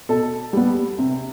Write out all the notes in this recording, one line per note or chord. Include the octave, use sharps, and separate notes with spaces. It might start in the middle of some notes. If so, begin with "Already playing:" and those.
B2 A4
G3 B3
C3